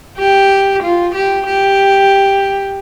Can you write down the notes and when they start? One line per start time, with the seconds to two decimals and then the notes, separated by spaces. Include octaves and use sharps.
0.18 G4
0.83 F4
1.15 G4
1.46 G4